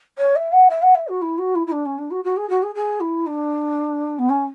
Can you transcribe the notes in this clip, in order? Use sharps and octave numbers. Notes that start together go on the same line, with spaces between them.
C#5
E5
F#5
E5
F#5
E5
F#4
E4
F#4
E4
E4
D4
C#4
D4
F#4
F#4
G#4
F#4
G#4
G#4
E4
D4
B3
C#4